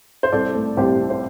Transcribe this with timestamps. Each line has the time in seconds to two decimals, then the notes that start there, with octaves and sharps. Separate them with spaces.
0.23 C5
0.32 C2 A4 D5
0.55 A3
0.77 C2 G4 C5
0.99 C3
1.10 C5